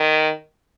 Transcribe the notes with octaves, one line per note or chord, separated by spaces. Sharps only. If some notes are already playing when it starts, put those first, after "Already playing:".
Already playing: D#3